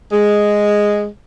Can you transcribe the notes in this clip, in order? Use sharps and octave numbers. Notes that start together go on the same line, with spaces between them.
G#3